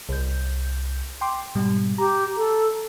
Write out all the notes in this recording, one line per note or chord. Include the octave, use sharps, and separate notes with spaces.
C2 G6
G5 C6 D6
G#2 B2 G3
G4 A#5
A4